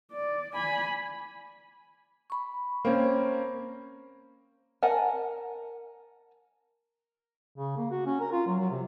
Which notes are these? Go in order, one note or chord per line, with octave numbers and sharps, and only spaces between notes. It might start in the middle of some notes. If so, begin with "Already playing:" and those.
D5
G#5 B5
B5 C#6
A#3 C4 C#4
A#4 F#5 G#5 A5
C#3
A#3
F#4
C#4
A#4
F4
F#3
F#3
C3